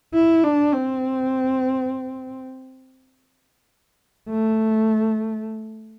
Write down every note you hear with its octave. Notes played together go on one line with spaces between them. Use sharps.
E4
D4
C4
A3